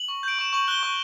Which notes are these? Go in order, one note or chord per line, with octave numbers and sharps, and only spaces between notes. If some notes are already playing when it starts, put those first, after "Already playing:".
Already playing: F#7
C#6
G6 D7
C#6 E7
C#6 F#7
F#6 G7
C#6